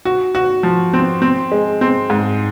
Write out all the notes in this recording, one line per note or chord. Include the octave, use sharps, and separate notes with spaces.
F#4
F#4
F3
C4
C4
G#3
C4
G#2